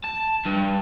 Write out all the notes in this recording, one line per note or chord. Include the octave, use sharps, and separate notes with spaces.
A5
G2